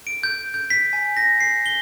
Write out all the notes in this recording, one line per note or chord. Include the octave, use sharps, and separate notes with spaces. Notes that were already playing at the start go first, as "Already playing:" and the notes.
D7
G6
G6
B6
G#5
A#6
C7
G7